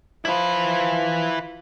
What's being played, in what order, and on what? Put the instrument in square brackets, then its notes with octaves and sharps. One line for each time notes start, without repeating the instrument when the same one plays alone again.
[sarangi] F3 [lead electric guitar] E4 B4